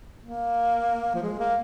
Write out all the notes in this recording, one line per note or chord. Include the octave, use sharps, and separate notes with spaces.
A#3
F3
G#3
A#3